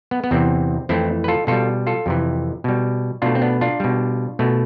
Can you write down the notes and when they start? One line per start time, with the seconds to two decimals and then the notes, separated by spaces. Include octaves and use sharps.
0.11 B3
0.24 B3
0.31 E2 C3 E3 C4
0.89 F2 E3 A3 C4 E4
1.24 B4
1.28 F4 A4
1.47 B2 G3 F4 A4
1.87 F4 A4
2.06 F2 C3 E3
2.64 B2 G3
3.22 B2 A3 D4 F4
3.35 C4
3.42 B3 D4
3.61 D4 F4
3.80 B2 G3
4.39 B2 A3